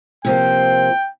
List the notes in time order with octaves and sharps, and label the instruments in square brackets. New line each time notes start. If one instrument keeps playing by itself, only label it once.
[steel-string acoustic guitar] C3 F3 A#3 [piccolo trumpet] G5